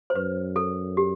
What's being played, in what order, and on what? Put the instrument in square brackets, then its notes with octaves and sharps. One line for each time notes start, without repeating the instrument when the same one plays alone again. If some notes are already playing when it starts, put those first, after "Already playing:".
[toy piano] C5
[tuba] F#2 [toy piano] B4
[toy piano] A4
G4